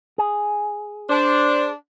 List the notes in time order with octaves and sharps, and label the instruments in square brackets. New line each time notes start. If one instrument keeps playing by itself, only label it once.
[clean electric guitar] G#4
[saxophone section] D4 [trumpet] C5